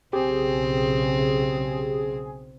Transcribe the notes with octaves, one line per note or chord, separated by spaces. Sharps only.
B1 C#3 C4 G4 G#4